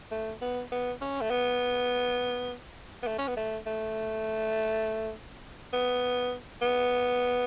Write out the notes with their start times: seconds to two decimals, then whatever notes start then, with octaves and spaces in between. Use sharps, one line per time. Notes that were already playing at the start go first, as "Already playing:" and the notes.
0.11 A3
0.42 B3
0.72 B3
1.01 C#4
1.21 A3
1.31 B3
3.03 B3
3.07 A3
3.18 C#4
3.28 B3
3.37 A3
3.67 A3
5.73 B3
6.62 B3